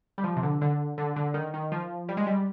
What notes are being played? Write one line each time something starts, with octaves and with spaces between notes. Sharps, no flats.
G3
F3
C3
D3
D3
D3
D3
D#3
D#3
F3
G3
G#3
G3